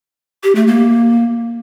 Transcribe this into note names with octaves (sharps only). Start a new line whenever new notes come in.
G4
A3
A#3